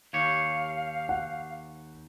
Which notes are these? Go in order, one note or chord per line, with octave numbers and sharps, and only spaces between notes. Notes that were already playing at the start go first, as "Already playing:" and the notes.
D#2 G4 C#5 F5
F#5